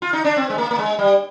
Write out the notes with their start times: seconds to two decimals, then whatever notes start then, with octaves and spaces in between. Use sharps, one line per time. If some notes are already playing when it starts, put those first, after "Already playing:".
0.02 F4
0.13 D#4
0.24 D4
0.36 C4
0.50 G#3
0.58 A#3
0.71 A#3
0.79 G#3
0.99 G3